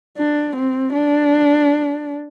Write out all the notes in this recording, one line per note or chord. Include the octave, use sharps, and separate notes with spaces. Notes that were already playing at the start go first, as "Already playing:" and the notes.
D4
C4
D4